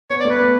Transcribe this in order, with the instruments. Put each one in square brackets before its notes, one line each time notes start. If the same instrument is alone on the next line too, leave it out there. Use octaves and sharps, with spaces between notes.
[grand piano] B3 [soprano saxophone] C#5
[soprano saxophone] D5
[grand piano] A3
[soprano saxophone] B4
[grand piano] B3